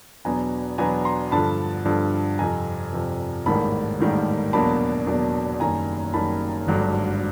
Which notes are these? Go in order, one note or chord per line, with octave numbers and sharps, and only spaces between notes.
E2 B2 F#3 B3 D4 G#5 A#5
E2 B2 F#3 B3 D4 G#5 A#5
A#5 C6
G2 D3 F3 A5 B5
G2 D3 F3
F2 C3 F3 G#5 A#5
F2 C3 F3
A1 G#2 D#3 G3 A#3 A5 B5
A1 G#2 D#3 G3 A#3
E2 B2 F#3 A#3 D4 A5 B5
E2 B2 F#3 A#3 D4
F#1 F#2 D#3 G3 G#5 A#5
F#1 F#2 D#3 G3 A5 B5
G#1 G2 D3 F#3